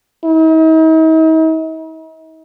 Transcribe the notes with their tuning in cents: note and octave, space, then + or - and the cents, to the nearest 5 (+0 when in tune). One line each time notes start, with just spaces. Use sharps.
D#4 +45